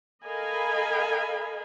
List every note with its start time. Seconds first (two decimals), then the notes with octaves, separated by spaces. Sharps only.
0.24 A4 A#4 D#5 F5 G#5 B5